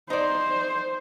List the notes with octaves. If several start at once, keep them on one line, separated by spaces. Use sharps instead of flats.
D#4 C5 D5